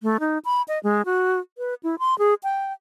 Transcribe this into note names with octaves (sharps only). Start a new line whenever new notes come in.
A3
D#4
B5
D#5
G#3
F#4
B4
E4
C6
G#4
G5